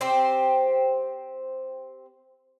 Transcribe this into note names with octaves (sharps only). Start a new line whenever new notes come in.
C4 G4 C5